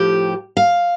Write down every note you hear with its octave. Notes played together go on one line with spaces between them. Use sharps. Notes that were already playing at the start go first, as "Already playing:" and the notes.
Already playing: A2 F3 G4
F5